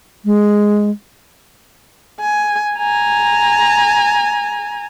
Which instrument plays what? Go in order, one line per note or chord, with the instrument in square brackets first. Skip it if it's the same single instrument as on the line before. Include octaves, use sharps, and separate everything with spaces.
[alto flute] G#3
[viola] G#5
G#5 A#5